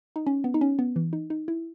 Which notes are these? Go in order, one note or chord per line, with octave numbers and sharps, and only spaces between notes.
D#4
C#4
B3
D#4
C#4
B3
E3
D#4
D#4
E4